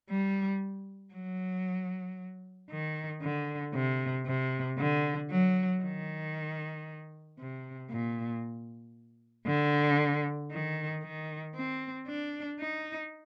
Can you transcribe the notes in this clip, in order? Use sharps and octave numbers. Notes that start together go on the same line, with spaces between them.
G3
F#3
D#3
D3
C3
C3
D3
F#3
D#3
C3
A#2
D3
D#3
D#3
C4
D4
D#4